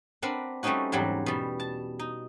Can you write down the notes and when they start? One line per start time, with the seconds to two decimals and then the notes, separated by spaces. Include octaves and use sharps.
0.22 C4 D4 A#4 B4 F#5
0.63 G3 A3 C4 C#4 D#4 F#4
0.92 E2 G#2 F#3 G3 G4
1.26 B2 G3
1.60 A5
1.99 D#4